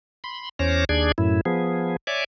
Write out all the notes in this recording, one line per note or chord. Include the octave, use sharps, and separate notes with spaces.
B5 C6
E2 C#4 C5 C#5 D6 A#6
D#2 D4 G#4 D5 G#6
F#2 A2 E4
F3 B3 G#4
C#5 D5 E5 G#5 D6